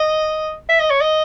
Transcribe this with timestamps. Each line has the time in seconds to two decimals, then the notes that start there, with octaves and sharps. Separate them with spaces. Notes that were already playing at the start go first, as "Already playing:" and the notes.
Already playing: D#5
0.69 E5
0.80 D#5
0.90 C#5
1.01 D#5